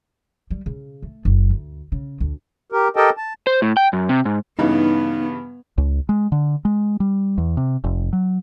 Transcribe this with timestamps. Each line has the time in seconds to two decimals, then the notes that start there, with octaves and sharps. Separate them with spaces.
0.50 G3
0.66 C#3
1.02 A3
1.25 F#1
1.50 D2
1.92 C#3
2.20 D2
2.72 G4 A#4
2.96 G4 A4 A#4 D#5 G5 A5
3.17 A5
3.47 C5
3.62 A2
3.77 G5
3.93 F#2
4.09 C3
4.25 G#2
4.59 G2 C#3 E3 B3 D#4
5.78 C#2
6.09 G#3
6.32 D3
6.65 G#3
7.00 G3
7.38 E2
7.57 C3
7.84 F1
8.13 F#3